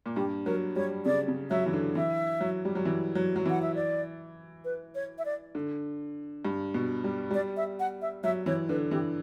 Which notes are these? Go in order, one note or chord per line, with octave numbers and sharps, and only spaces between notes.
A#2
G2 G4
F#3 A#4
G3 C#5
C#3 D5
C#3
F#3 E5
E3
D3
E3 E5
F#3
G3
F#3
E3
F#3
F#3
E3 F#5
E5
D5
B4
C#5
E5
D5
D3
G2
B2
G3
G3 D5
E5
F#5
E5
F#3 E5
E3 C#5
D3 B4
E3 G4